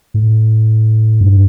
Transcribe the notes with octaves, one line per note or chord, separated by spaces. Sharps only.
A2
G2